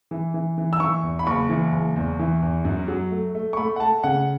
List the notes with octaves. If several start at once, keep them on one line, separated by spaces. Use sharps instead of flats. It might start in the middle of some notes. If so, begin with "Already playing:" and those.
E3
E3
E3
E6
E3 C#6
E2
B5
F#1 C#6
E3
F#1
E2
E3
E2
F#2
F#3
A3
A3
C#6
A3 B5
F#5
A3 A5
C#3 F#5